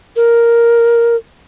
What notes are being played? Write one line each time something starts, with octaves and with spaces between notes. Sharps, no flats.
A#4